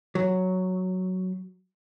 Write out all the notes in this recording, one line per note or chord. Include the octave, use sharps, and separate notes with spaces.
F#3